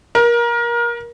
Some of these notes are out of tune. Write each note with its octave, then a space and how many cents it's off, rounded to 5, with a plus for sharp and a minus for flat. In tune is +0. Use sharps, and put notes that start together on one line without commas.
A#4 +25